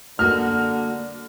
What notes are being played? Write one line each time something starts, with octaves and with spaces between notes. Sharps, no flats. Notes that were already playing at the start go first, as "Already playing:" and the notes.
D3 G3 A#3 F#4 F6